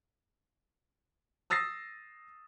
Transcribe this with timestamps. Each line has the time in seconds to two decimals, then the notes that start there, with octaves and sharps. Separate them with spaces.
1.50 D#6 E6 A6 A#6 C7